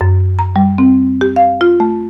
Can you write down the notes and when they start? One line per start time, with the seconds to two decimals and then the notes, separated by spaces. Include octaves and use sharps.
0.01 F#2
0.39 A#5
0.56 G3
0.78 C4
1.21 G4
1.36 F5
1.61 F4
1.80 A3